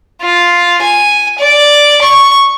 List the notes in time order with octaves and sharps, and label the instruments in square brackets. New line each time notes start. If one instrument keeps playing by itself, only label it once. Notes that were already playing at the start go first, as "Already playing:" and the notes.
[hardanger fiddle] F4
G#5
D5
C#6